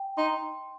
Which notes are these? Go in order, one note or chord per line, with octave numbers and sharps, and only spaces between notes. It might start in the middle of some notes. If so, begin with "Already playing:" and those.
Already playing: G5
D#4 C6